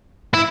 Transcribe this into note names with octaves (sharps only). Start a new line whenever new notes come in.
E4